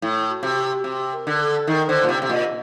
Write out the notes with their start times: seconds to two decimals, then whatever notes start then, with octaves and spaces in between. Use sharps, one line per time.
0.02 A2
0.29 F#4
0.43 C3
0.57 G4
0.84 C3
1.12 A#4
1.27 D3
1.40 A4
1.67 D#3 A#4
1.88 D3 C5
2.04 A#2
2.09 C3
2.22 C3
2.29 A#2 D#5